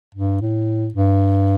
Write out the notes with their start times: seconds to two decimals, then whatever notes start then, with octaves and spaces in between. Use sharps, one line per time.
0.15 G2
0.41 A2
0.94 G2